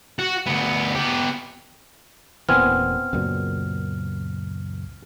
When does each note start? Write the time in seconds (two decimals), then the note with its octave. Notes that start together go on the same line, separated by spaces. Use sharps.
0.19 F#4
0.46 D2 B3
0.95 B3 G4
2.49 E1 A#2 E3 B3 C4 G#5 F6
3.13 C#2 F#2 A#2